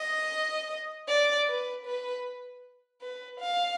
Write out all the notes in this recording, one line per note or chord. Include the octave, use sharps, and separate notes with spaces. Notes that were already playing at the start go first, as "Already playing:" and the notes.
Already playing: D#5
D5
B4
B4
B4
F5